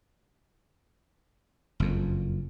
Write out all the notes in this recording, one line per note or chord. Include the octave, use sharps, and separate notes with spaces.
F#1 F2